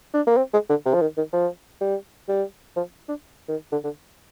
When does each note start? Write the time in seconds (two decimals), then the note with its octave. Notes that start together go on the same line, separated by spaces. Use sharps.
0.14 D4
0.27 A#3
0.37 C4
0.53 G#3
0.69 D3
0.85 C3
0.94 F3
1.01 D#3
1.17 D#3
1.33 F3
1.81 G3
2.28 G3
2.76 F3
3.09 D4
3.48 D#3
3.72 D3
3.84 D3